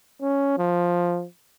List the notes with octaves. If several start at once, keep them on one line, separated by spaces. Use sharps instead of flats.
C#4
F3